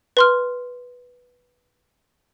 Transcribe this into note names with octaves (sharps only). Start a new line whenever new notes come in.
B4 C6 F6